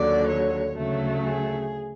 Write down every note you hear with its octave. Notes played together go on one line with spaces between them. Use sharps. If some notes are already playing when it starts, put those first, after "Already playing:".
Already playing: D#2 D3 F#3 D5
C#5
D2 C#3 F#3 A3
G#4